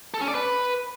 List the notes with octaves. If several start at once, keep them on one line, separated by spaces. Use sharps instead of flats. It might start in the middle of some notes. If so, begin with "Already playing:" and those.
A4
C#4
D5
B4